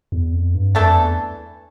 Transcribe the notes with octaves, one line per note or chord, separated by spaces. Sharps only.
E2
F2
G2
F2 E3 A3 D4 A4
E2